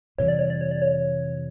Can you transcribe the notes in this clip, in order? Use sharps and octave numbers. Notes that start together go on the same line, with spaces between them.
F2 C3 E3 G3 C#5
D5
C#5
D5
C#5
D5
C#5